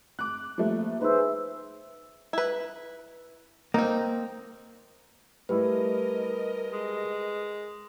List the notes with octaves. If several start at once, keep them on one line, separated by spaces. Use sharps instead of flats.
D6 F#6
F3 G3 A3 A#3
D#4 G#4 B4 C5 E5 E6
E4 B4
A#3 C4 D#4
G3 A3 E4 A#4 B4 D#5
G#3